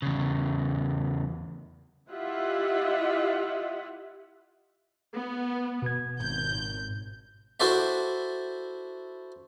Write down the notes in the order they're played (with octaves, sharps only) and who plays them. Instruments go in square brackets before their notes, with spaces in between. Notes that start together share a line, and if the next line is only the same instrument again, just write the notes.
[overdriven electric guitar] E2 C#3
[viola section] E4 F4 G4 D#5 E5 F#5
[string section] B3
[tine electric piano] B2 G#6
[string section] G#1 G6
[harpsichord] E4 F#4 A4 C5 D5 E5